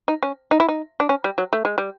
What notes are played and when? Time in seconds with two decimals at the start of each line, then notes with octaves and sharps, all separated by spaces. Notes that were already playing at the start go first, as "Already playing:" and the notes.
0.08 D#4
0.23 C#4
0.51 D#4
0.60 E4
0.68 D#4
1.00 D4
1.09 C#4
1.24 G3
1.38 F#3
1.53 A3
1.65 G#3
1.78 G3